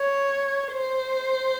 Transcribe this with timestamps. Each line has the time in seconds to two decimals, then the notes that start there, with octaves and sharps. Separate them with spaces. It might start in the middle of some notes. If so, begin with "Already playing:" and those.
Already playing: C#5
0.72 C5